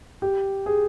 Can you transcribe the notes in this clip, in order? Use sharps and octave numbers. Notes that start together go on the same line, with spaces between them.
G4
G#4